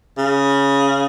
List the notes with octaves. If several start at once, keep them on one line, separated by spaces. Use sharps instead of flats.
C#3